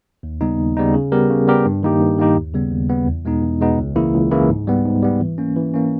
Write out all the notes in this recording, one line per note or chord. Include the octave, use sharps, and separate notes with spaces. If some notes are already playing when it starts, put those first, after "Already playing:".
D#2
C#3 G3 B3 D#4
D#2
C#3 G3 B3 D#4
C#3
G3 B3 G4 A#4
C#3
G3 B3 G4 A#4
G2
D#3 A#3 D#4 G4
G2
D#3 A#3 D#4 G4
D#2
C#3 G3 B3
D#2
C#3 G3 B3
E2
B2 G#3 B3 D#4
E2
B2 G#3 B3 D#4
C#2
C#3 E3 A#3 E4
C#2
C#3 E3 A#3 E4
G#2
G3 B3
G#2
G3 B3
E3
A#3 C#4
E3
A#3 C#4